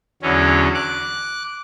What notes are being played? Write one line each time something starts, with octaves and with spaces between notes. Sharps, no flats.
E2 D3 F#3 C#4
D6 F#6